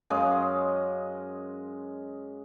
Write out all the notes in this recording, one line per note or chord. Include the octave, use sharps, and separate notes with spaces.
F#2 G#3 D#5 F5